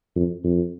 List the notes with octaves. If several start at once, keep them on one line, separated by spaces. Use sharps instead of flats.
F2
F2